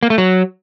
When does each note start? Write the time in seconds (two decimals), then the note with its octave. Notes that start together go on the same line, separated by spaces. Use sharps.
0.03 A#3
0.10 A3
0.18 F#3